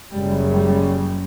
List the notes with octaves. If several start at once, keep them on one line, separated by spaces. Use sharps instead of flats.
F#1 F#2 C#3 G3
G3